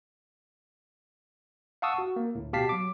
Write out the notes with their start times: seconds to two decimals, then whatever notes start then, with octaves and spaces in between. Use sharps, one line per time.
1.82 F5 F#5 A5 C#6 D#6 E6
1.98 F#4
2.16 A#3
2.35 D2 A2
2.53 B2 G4 F5 A5 B6 C7
2.69 F#3 D6